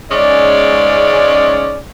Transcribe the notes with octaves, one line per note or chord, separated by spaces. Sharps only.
G#2 C#3 G#3 C#4 D5